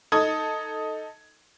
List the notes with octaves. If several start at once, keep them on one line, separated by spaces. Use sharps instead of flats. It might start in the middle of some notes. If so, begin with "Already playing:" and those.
D#4 A4 D#6 G#6